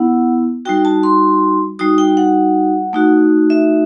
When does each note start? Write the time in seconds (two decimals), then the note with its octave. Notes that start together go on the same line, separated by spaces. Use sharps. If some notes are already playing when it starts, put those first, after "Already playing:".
Already playing: B3 E4 F#5
0.65 G3 D#4 F#4 G5
0.85 A5
1.03 C6
1.79 G3 D#4 F#4 D#6
1.98 G5
2.17 F#5
2.93 A3 D#4 F#4
3.50 E5